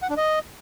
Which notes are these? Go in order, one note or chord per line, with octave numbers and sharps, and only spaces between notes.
F#5
D4
D#5